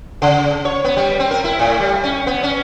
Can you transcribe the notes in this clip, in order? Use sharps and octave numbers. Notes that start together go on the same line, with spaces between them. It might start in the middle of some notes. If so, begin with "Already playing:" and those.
C#3
C#5
B3
G3
C4
A#4
E4
A2
G3
C#4
B3
C#4